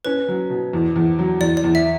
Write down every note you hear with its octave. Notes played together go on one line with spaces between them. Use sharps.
C#4 B4
F#3
B2
E2
E2
F#3
E2 D5
D5
E2
E5